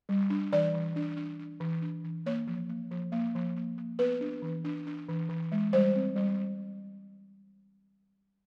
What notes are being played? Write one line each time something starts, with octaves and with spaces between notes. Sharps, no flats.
G3
D4
E3 D5
E3
D4
D4
D4
E3
D4
E3
A#3 C#5
F3
A#3
F3
A#3
F3
A#3
A#3
B3 B4
D4
E3
D4
D4
E3
E3
G#3
G3 C5
C4
G3